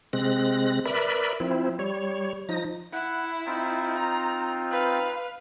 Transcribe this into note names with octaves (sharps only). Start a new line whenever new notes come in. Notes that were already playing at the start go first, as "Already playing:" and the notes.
C3 G#3 C4 F#6 A#6
A#4 B4 D5 E5 B5
F3 C4 E4
G3 C#5
F3 D#4 A#6
E4 F#5
C4 D#4 F4
A#5
B4 F5